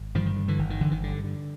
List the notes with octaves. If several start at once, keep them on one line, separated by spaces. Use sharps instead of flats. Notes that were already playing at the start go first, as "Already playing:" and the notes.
Already playing: G#1
G2 D#3 F3
D#3
D3
D3 E3
G1 D#3
D#3
G1 D3 E3
D#3
G2 D3
D3